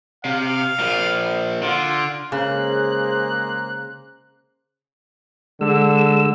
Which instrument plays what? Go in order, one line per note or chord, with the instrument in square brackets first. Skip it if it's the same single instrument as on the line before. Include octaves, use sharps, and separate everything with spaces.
[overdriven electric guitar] C3 [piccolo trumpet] F5
[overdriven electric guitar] A#2 F3
[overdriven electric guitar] D3 [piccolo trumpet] F4
[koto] C#3 [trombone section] G#3 G#4 C5 [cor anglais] A#3 [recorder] F#6
[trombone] D3 [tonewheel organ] G#3 E6